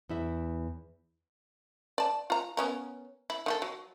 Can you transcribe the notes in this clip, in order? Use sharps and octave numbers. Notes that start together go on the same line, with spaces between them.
E2 E4 E5
D5 A5
F4 A#5
B3 C#4 A#4
E4
D#3 F#4 A4
F#3